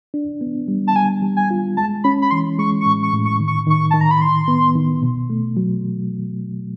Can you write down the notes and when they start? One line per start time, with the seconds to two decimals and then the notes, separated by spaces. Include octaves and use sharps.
0.14 D4
0.41 B3
0.68 G3
0.87 A5
0.95 G3 G#5
1.22 G3
1.37 G#5
1.51 F4
1.77 G#3 A5
2.04 C#4 B5
2.22 B5
2.31 E3 C6
2.59 G#3 C#6
2.81 C#6
2.86 A2
3.03 C#6
3.13 A2
3.25 C#6
3.40 D#3
3.48 C#6
3.67 D#3 C#6
3.91 D#3 A5
4.01 A#5
4.11 B5
4.21 D#3 C6
4.48 B3
4.75 D#3
5.03 B2
5.30 A3
5.57 F#3